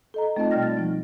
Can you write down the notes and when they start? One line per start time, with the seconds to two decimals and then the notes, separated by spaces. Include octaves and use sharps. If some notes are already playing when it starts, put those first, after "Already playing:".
0.14 A4 D#5 A#5
0.36 A3 C4 D#4 F4 D#5 A5
0.51 B2 G3 D5 G5 F6 A#6
0.63 A6
0.77 F3 G#3 D#4